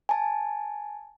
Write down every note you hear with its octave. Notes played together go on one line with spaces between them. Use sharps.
G#5 A5